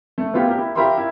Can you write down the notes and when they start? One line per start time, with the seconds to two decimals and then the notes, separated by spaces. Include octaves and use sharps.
0.18 A3
0.34 B3 E4 F4 G4
0.47 G4 A#4
0.58 E4
0.75 F4 G4 A#4 E5 B5 C6
0.97 E4